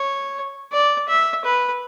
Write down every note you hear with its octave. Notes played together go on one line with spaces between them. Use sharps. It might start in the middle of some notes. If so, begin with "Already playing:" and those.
Already playing: C#5
D5
E5
B4